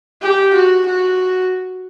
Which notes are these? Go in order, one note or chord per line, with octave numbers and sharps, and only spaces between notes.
G4
F#4
F#4